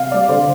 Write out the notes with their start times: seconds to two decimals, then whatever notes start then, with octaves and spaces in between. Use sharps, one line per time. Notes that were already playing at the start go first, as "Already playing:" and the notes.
Already playing: C3 F5
0.11 G3 C4 D5
0.28 D3 C5